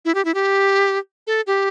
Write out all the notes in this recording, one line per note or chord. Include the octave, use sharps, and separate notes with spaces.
E4
G4
E4
G4
A4
G4